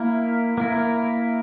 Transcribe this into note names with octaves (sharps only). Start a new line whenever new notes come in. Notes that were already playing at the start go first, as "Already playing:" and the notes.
Already playing: A#3 E4 A#4
A#3 E4 A#4